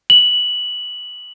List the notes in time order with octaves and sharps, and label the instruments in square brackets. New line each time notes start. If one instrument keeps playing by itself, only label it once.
[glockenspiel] F#7